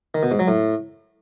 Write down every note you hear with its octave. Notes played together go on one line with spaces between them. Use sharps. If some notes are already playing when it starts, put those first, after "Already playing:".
D#3
B2
G#2
F#3
A2